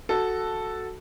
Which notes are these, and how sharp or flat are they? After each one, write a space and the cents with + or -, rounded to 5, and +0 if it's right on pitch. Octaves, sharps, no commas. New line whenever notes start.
F#4 +0 A4 +0